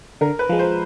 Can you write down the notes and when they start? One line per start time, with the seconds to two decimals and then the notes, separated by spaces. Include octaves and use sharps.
0.21 D3 A#4
0.39 B4
0.49 F3 G#3
0.59 C5